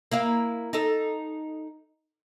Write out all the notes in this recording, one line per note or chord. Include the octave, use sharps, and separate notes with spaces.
A#3 E4 F5
D#4 A4